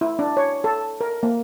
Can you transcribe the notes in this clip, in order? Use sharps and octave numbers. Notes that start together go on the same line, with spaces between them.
E4
D4
C#5
A4
A#4
A#3